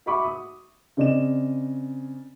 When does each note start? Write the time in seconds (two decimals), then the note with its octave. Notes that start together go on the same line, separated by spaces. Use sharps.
0.06 F#4 E5 B5 C#6 D6
0.25 D#6
0.97 C#3 C4 D5 D#5 E7